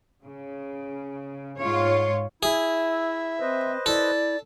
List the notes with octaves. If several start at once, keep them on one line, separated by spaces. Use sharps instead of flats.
C#3
G#2 F4 C#5
E4 G#4 E5
C4 B4 C5 D#5
E4 A4 D5